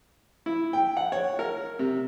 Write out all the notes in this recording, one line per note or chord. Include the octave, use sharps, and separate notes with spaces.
E4
G5
F#5
C#5
A#4
C3